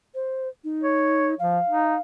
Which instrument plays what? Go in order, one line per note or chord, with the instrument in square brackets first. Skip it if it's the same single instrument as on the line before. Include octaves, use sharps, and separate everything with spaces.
[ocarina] C5
D#4
[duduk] C#5
[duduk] F3 [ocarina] F5
[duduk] D#4